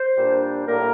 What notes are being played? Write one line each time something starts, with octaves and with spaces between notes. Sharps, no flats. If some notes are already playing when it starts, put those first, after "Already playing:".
Already playing: C5
A#2 G3 D4
A2 G3 A#3 A#4